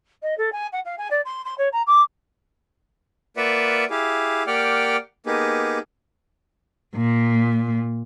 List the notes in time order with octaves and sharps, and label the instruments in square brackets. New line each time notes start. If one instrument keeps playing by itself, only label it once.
[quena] D#5
A4
G#5
F#5
F5
G#5
D5
C6
C6
C#5
A#5
D6
[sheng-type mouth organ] A#3 F4 B4 D5 E5 F#5
E4 G4 G#4 F5
A#3 G4 D5 F#5 G5 F6
A#3 B3 D#4 G4 G#4
[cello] A#2